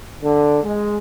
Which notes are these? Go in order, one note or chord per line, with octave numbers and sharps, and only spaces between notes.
D3
G#3